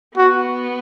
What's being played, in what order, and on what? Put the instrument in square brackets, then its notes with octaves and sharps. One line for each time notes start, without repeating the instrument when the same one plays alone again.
[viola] B3 [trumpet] F#4